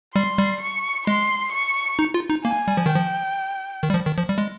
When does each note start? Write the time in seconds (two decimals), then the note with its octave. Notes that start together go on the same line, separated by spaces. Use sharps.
0.15 G3 C6
0.38 G3
0.61 C#6
1.07 G#3 C6
1.52 C#6
1.99 D#4
2.14 F4
2.30 D#4
2.45 A#3 G#5
2.68 G3
2.77 F3
2.86 D#3
2.91 F3 G5
3.83 D#3
3.90 G3
3.94 F3
4.06 D#3
4.18 F3
4.29 G3
4.38 G#3